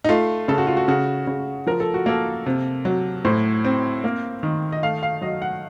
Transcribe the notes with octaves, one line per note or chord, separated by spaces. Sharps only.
D#4
A3 F4
C#3 A4
F#4
F4
F#4
C#3 F#4
C#3
F3 A#4
A4
F#4
A#3 A4
C3
F#3
A2 C5
C4
A#3
D#3
D#5
A3 F5
F5
F#3 D#5
F#5